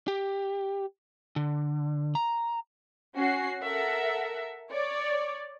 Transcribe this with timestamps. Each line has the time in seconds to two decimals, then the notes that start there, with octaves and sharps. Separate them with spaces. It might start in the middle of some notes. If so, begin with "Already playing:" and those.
0.08 G4
1.36 D3
2.15 A#5
3.15 C#4 F#4 C7
3.62 A4 A#4 E5 F#5
4.71 C#5 D5